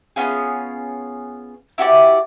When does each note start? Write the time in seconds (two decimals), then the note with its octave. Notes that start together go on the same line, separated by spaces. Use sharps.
0.16 B3 C#4 F4 G#4
1.78 E4 F#4 G4 D5